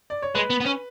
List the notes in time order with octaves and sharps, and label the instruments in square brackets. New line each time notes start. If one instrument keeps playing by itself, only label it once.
[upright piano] D5
C#5
[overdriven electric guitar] G#3 [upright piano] B4
[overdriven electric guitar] B3
B3
C#4